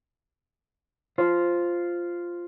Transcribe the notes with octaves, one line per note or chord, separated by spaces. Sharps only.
F4 C5